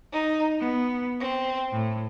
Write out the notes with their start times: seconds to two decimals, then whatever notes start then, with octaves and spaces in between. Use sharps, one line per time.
0.12 D#4
0.59 B3
1.20 C4
1.71 A2